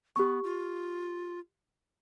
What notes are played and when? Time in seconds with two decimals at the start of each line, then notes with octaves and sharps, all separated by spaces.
0.16 B3 G4 C#6
0.44 F4